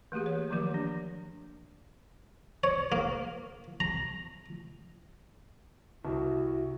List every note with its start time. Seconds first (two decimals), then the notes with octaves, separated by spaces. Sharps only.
0.12 E3 A3 A#3 G4 G#4
0.26 C#5
0.50 D#3 F3 F#3 A#3 G4 D5
0.74 D4
2.64 C#5
2.92 A#3
3.80 A#5
6.05 C2 E4 F#4